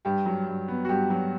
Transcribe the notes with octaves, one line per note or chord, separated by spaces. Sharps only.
G2 G4
F#3
G2
B3
F#4
G2 G4
F#3